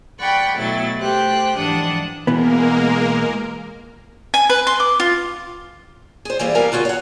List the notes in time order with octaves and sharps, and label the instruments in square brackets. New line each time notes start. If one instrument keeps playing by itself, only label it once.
[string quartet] D5 F#5 G5 B5 C#6
B2 F#3 A3 E4 A6
A3 G4 C5 G5 F#6
G#2 E3 F3 D4 F#5 D#6
[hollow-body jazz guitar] B2 E3 B3 [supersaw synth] G#3 A#3 A#4
[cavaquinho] G#5
B4
C6
D6
F4
[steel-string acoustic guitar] G#4 C5
E3 G3 A#3 G#4 E5
E2 G3 A#4 F5 G#5 A#5
D3 F4 F#4 G#4
C#5 F#5